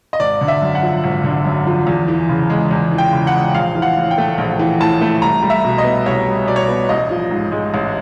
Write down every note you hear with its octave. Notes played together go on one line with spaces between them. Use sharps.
D#5
G#1 D5
D3
E5
F#2
F#5
F3
G#1
D3
F#2
F3
E2
E3
C#3
G#3
E2
E3
G5
C#3
F#5
G#3
A#1 F5
E3
F#5
A2
G5
A3
A#1
E3
A2 A5
A3
C2 A#5
G3
E5
B2
D#5
B3
C2 C#5
G3
B2 D5
C#5
B3 D5
A1 D#5
F3
G#2
G#3
A1